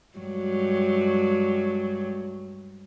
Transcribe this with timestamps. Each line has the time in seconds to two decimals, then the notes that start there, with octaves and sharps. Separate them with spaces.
0.17 G2 F#3 G#3